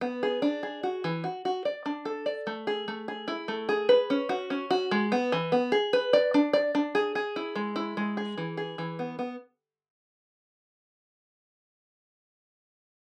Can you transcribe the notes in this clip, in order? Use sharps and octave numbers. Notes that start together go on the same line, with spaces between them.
B3
G#4
D4
G#4
F#4
E3
F#4
F#4
D5
D4
A4
D5
A3
G#4
A3
G#4
E4
A3
G#4
B4
C#4
F#4
C#4
F#4
G#3
B3
E3
B3
G#4
B4
D5
D4
D5
D4
G#4
G#4
E4
G#3
E4
G#3
G#4
E3
G#4
E3
B3
B3